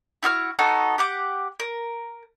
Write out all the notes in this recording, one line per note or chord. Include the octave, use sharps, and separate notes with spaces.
E4 F#4 E6 F6
B3 D#4 F#4 A4
G4 F#5 D6
A#4